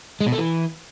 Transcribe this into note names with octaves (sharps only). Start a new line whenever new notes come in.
G#3
B2
A3
E3